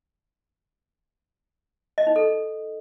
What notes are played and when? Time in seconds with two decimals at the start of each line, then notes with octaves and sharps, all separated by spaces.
1.98 D#5
2.07 D#4
2.16 A4